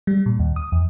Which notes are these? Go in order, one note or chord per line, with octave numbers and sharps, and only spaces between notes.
G3
A#2
D#2
D#6
E2